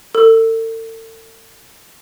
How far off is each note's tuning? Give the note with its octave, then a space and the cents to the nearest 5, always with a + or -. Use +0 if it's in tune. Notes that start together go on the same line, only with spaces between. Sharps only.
A4 +40 E6 +0